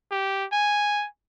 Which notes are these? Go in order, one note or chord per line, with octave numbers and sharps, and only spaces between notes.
G4
G#5